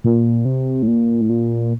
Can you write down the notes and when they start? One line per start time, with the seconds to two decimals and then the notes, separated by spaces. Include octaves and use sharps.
0.04 A#2
0.45 C3
0.83 A2
0.88 A#2
1.21 A2
1.29 A#2